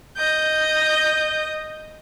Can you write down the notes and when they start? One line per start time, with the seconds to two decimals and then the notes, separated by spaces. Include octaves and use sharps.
0.17 D#5 G6